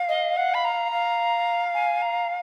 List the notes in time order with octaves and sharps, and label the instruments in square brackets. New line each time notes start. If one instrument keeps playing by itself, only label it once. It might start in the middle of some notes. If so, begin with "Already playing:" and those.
Already playing: [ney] F5
[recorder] D#5
F#5
B5
A#5
[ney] F5
[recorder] G#5
A#5